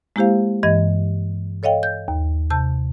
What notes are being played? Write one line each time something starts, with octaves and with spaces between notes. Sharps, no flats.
G#3 A#3 E4 G4 C5 F5
G2 E3 D#5 G#6
A4 C#5 D#5 F5 G5
G6
D#2
C3 A5 G6